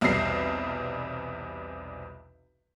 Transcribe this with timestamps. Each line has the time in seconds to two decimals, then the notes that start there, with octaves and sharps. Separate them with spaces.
0.01 B1 E2 C3 G3 A#6 C7